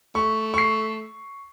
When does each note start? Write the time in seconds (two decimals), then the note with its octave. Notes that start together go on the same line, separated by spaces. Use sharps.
0.15 A3 C#6
0.54 C#6 C7